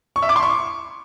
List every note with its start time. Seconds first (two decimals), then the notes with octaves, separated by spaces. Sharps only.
0.16 C#6
0.23 E5
0.29 D6
0.36 C6
0.42 C#6